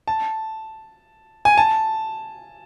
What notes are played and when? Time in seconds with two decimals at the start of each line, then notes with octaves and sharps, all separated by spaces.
0.08 A5
1.45 G#5
1.58 A5